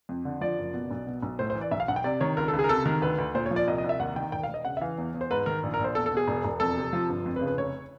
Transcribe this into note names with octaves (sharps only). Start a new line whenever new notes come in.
F2
D3
F3 D5
F#1
B2
B1
B2
B1
A2 C5
C5
E3
D5
B1 E5
F5
B1 F#5
G5
C3 D5
D#3 C#5
C#2 A#4
A4
C#2
G#4
A#4
C3 A4
D#3 A#4
D2 B4
D2
A#2 C5
C#5
F3
D5
C2 D#5
D#5
C2
E5
D#2 F#5
D#3 G5
E1 G5
F5
E1
D#5
C#3 F#5
E5
E3 F5
E2
E2
C5
G#2 B4
D#3 A#4
A#1
A#4
A#1
C5
E2 A4
A4
B2
G#4
E1
E1
F2 A4
C3
F3
G1
F2
B4
C#3
B4
F1 C#5